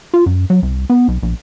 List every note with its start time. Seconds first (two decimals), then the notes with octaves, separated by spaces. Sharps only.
0.14 F4
0.26 F#2
0.50 F#3
0.63 C2
0.90 B3
1.08 B1
1.23 A#1